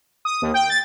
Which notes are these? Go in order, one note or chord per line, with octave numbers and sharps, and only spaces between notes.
D#6
D#2
G5
A6